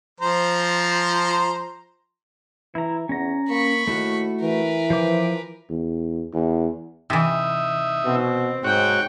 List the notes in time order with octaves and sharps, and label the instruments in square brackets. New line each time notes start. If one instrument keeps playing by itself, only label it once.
[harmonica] F3 C5 A#5
[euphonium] E3 [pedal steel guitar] E4 A#5
[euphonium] E2 [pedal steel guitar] C#4 A#5
[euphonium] A#3 [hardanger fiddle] B5 C#6
[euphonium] D#2 [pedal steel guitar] A3 E4 F#4
[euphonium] E3 [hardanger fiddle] A#4 B4
[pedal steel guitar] F3 C5 D6
[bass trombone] E2
E2
[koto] C3 E3 [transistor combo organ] D#4 E5
[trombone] B2 [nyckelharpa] C4
[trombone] G#2 [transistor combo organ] F#4 C#5 [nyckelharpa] G5